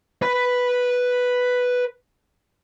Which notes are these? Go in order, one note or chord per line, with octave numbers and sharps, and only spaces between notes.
B4 B5